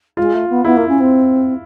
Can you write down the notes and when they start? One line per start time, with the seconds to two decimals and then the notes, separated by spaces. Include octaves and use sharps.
0.17 G#3 F4
0.33 A3
0.49 B3
0.65 B3 E4
0.76 A#3
0.88 C#4
1.00 C4